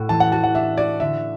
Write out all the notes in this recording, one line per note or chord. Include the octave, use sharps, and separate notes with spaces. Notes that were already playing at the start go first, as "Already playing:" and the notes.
Already playing: A2 F#4
E3 A5
F#5
F#4 A5
F#5
D4 E5
F#4 D5
D3 E5